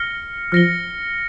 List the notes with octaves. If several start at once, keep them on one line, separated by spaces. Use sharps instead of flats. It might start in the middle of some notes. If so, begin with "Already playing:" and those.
Already playing: F6 A#6 C#7 G7
F3 F6 A#6 C#7 G7